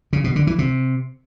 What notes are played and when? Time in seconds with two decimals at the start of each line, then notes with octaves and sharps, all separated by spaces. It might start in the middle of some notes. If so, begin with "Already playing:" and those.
0.13 C#3
0.24 B2
0.36 D3
0.47 E3
0.59 C3